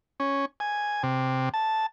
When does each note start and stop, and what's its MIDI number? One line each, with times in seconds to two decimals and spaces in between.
0.20 0.45 61
0.60 1.03 80
1.03 1.49 48
1.54 1.86 81